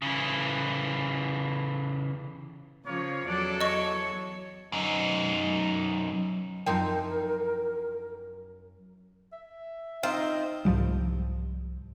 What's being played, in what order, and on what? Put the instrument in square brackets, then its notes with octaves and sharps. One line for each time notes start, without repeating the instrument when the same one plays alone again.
[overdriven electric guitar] C#3 E3
[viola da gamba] C#3 F3 [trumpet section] A#3 C#5
[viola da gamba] E2 F#3 A4 [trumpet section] D4 D5
[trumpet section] C#5 [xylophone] D#5 C#6
[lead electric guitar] F#2 D#4
[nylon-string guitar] F#2 E4 [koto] F3 C4 D#4 [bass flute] A#4 [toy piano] G5
[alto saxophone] E5
[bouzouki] C4 [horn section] D#4 D#5 [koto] F4
[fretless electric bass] C2 G#2 F3 G3